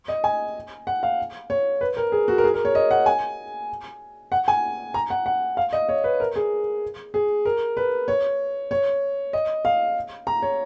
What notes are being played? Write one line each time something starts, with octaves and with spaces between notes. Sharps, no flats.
D#5
G#5
F#5
F5
C#5
B4
A#4
G#4
F#4
A#4
G#4
A#4
C#5
D#5
F#5
G#5
F#5
G#5
A#5
F#5
F#5
F5
D#5
C#5
B4
A#4
G#4
G#4
A#4
B4
C#5
C#5
D#5
F5
A#5
C#5